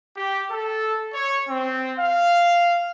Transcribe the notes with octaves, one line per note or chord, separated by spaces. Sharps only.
G4
A4
C#5
C4
F5